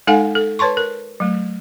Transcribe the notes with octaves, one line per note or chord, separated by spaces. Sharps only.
G#3 D#4 A4 F5 F#5 G#5
A4
B4 C#5 A5 C6 C#6
A#4
F#3 A3